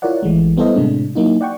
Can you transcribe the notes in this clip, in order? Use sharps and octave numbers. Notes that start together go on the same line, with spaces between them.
E4 F4 A#4 C#5 D5 F#5
A1 E3 G#3 A3
G3 B3 E4 A4 C5 D#5
A2 C3 G#3 A3 D4
F#3 A#3 D#4 E4
D5 F#5 G5 C#6